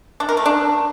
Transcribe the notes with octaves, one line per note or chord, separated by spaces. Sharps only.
D4
A#4
A3
D4